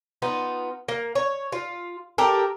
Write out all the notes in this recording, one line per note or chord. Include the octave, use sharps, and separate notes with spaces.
B3 D#4 F4
A#3
C#5
F4
G4 A4 A#4